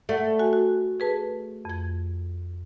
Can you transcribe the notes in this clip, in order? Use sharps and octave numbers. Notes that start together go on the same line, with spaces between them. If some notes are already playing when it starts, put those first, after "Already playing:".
A3 D5 F#5
F#4 G#5
F#4
G#4 B4 A5
F2 G#6